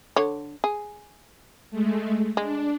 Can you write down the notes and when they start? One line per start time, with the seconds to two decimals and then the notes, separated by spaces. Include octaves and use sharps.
0.16 D3 C#5
0.64 G#4
1.71 G#3 A3
2.37 G#3 D4